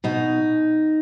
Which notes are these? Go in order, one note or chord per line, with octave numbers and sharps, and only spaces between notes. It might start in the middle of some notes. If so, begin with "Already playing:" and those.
B2 D#4